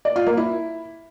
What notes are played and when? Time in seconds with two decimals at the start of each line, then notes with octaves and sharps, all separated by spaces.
0.05 D5
0.16 F4
0.26 A#3
0.37 E4